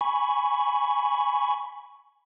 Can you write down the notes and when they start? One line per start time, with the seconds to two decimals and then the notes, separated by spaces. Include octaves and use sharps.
0.01 G#5 B5 C#6